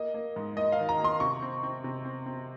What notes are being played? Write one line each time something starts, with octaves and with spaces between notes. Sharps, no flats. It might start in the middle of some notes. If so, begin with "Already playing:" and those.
Already playing: A#3 D#5
A#3
G#2
A#3 D#5
F5
D#3
A#5
A#3 C6
C3 C#6
C4
C4
C3
C4
C4